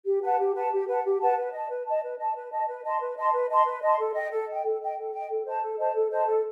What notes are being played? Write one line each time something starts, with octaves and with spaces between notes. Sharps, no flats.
G4
B4 F#5 A5
G4
B4 F#5 A5
G4
B4 F#5 A5
G4
B4 F#5 A5
B4
D#5 A5
B4
D#5 A5
B4
D#5 A5
B4
D#5 A5
B4
D#5 A5 C6
B4
D#5 A5 C6
B4
D#5 A5 C6
B4
D#5 A5 C6
A4
D#5 G5
A4
D#5 G5
A4
D#5 G5
A4
D#5 G5
A4
C5 D#5 A5
A4
C5 D#5 A5
A4
C5 D#5 A5
A4